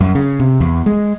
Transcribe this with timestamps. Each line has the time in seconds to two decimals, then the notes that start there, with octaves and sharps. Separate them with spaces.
0.01 F#2
0.15 C#3
0.40 C3
0.60 E2
0.86 G#3